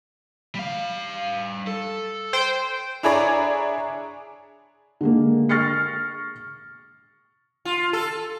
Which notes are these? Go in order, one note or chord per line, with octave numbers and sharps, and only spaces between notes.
G3 F5
A4
C5 G5
D4 E4 G#4 C#5 D5 A#5
D3 G#3 A#3
C#6 F6 A6 A#6 C7 C#7
F4
A4